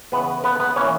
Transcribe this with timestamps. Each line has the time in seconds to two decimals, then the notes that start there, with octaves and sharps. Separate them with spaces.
0.12 C#3 E3 B3 B4
0.44 B3 B4
0.60 B3 B4
0.76 E3 A#3 C#4 C#5